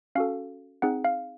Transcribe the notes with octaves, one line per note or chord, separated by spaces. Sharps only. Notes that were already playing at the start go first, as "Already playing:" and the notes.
C#4 F#4 A4 F5
C4 D#4 G#4 F#5
F5